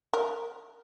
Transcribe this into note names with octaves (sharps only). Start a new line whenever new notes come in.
A#4